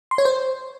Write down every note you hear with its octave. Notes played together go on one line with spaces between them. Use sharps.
C6
C#5
C5